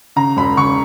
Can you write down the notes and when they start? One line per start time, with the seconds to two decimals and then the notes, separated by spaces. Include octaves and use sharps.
0.16 C#3 A#5
0.37 E1 B5
0.57 C#3 C#6